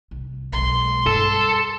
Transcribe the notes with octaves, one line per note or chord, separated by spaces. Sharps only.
C2
B1 G#3 C6
G2 A4